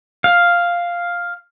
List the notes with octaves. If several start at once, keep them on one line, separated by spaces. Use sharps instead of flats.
F5